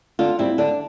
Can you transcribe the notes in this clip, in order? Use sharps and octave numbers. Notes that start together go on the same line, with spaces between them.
D3 F4
G3 C4 E4
D3 D4